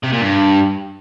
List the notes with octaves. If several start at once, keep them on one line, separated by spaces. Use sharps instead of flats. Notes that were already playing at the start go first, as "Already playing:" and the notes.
C3
A#2
G2